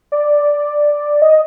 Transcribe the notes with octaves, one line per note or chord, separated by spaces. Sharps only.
D5
D#5